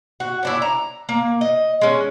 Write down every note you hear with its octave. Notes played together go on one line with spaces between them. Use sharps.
F#4
C#4 D4 E4
A#5
A#3
D#5
G#3 C#4